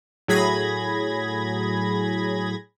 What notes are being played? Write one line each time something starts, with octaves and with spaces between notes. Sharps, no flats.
A2 F#3 G#4 B5 G#6 A#6